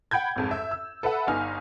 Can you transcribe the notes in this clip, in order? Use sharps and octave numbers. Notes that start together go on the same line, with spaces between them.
F#5 G5 B5 G6 G#6
A1 F2 G#2
E5
E6
A4 B4 E5 F#5 B5
G1 D#4 G#5 F6